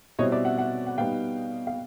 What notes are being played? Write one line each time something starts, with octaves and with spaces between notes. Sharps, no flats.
B2 G3 C4 E4 C#5 D#5
D5 E5
E5 F#5
E5 F#5
F#5
B2 G3 B3 D#4 F5 G5
F5